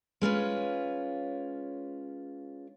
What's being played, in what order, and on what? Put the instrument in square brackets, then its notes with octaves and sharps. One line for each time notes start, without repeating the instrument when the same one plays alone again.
[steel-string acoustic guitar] G#3 C#4 F4 B4